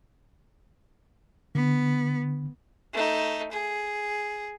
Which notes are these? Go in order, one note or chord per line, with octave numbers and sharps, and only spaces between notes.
D3 B3
A3 D#4
G#4